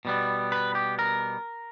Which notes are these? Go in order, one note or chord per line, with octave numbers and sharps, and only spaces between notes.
B2 G3 B3
B4
G4
A#4